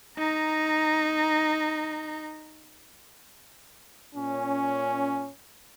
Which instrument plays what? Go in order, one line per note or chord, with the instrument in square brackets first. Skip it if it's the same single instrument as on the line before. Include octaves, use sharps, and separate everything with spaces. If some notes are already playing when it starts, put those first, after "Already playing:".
[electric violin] D#4 A#5
[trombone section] A#2 C#4